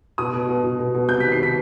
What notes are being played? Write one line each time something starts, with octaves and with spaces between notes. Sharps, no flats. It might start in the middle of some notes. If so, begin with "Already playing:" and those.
B2 D#6
B2
B2
B2
B2
B2
C3 G6
D#3 B6
C7
C3 B6